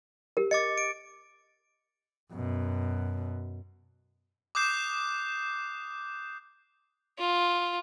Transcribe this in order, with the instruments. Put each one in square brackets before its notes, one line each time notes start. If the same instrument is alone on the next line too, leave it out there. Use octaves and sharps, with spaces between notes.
[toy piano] G4 A#4
[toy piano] D#5 [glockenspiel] D6 A6 C#7
[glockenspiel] D7
[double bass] F#2 B2
[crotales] D6 D#6 F#6 G6 C7 E7
[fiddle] F4